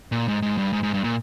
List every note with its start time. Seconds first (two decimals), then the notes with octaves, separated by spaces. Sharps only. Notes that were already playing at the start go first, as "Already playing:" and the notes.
0.12 A#2
0.28 G#2
0.42 G#2
0.58 G2
0.73 G#2
0.83 G#2
0.94 G2
1.04 A#2